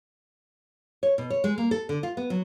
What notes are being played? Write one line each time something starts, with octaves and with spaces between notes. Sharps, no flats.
C#5
B2
C#5
G#3
A#3
A4
D3
F4
B3
F#3